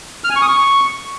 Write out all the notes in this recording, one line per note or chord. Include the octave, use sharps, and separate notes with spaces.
F6
G#5
C#6
D#6
C#6